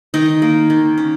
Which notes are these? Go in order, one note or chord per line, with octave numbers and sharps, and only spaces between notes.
D#3 D#4
A#3
D#3
C#4